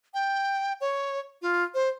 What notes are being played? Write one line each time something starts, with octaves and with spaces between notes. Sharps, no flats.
G5
C#5
F4
C5